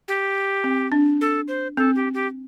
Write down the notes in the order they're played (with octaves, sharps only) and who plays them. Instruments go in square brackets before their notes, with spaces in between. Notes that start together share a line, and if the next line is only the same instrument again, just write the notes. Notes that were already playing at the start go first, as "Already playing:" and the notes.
[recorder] G4
[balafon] C4
D4
[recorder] A4
C5
[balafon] C4 [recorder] A4
[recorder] G4
G4